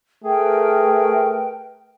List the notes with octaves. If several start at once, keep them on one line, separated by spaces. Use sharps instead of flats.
A3 G#4 A#4 B4 G5